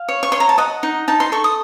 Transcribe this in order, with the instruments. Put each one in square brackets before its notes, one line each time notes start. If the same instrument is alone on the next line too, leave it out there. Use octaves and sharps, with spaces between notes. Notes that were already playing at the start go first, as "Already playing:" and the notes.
Already playing: [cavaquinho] F5
C#5
C#6
C#5 C6
A#5
A5
D#5 F#5
D#4
D#4 A5
C6
A4 C#6
D#6